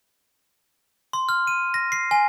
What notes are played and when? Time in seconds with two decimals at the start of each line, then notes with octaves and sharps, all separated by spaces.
1.13 C6
1.29 F6
1.47 D#7
1.74 A#6
1.92 C7
2.11 G#5